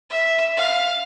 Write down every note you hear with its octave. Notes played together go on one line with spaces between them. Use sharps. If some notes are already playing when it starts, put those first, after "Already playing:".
E5
F5